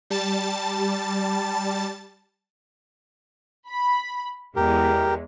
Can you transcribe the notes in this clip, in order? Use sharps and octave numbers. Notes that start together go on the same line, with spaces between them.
G3 A5 A6
B5
E2 G#3 G4 A#4